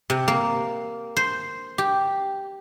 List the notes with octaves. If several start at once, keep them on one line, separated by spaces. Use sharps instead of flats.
C3
A#3
C5
G4